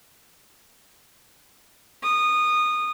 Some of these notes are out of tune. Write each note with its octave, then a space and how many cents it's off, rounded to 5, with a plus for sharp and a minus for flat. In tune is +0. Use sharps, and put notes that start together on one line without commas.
D#6 -20